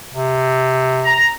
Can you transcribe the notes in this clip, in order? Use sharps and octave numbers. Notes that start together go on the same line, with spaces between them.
C3
A#5